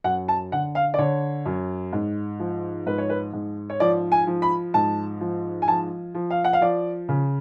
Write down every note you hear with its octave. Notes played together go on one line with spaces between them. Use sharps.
F#2 F#5
A5
D3 F#5
F5
D5
D3 C#5
F#2
G#2
F3
G#2 B4
C#5
B4
G#2
C#5
F3 D5
G#5
F3
B5
G#2 A5
F3
G#5
F3 A5
F3
F5
F#5
F5
F3 D5
C#3